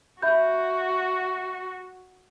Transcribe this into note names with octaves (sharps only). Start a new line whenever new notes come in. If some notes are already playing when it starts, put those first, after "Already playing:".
F#4 E5 B5 G6